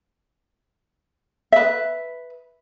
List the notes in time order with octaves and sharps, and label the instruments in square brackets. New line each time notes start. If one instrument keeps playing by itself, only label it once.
[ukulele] B4 E5